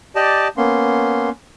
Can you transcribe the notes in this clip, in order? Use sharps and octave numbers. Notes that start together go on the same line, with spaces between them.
G4 D5 D#5 A5
A#3 B3 C#4 C6